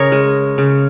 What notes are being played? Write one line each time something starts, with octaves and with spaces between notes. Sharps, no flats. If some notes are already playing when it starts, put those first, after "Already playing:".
Already playing: C#3 A#4 C#5 D#5
G#3
C#3